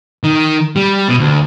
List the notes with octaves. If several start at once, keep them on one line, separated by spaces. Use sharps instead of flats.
D#3
G3
B2
D2